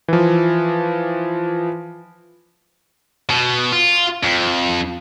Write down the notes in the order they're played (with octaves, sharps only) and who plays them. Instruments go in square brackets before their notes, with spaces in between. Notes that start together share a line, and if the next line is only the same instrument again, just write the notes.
[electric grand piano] E3 F3
[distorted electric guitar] B2
F4
F2